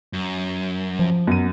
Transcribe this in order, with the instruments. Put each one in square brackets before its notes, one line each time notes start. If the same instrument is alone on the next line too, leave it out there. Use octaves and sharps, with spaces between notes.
[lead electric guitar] F#2
[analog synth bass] F3
[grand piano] F#2 D#7 [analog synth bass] B3